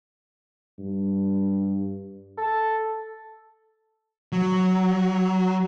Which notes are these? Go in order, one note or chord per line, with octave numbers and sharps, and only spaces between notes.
G2
A4
F#3